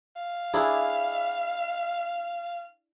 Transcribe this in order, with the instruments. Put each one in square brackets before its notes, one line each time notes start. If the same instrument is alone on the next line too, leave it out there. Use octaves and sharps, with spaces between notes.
[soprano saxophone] F5
[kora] D4 E4 G#4